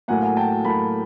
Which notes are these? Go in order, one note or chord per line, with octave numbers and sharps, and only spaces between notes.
A2 F#3 A#3 F#5 G#5
F#5 G#5
G5 A5
A2 F#3 A#3 A5 B5